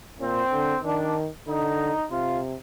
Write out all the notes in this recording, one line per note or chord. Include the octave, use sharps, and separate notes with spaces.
A#2 C4
D3
D#3 D4
D3 D#4
C3 F4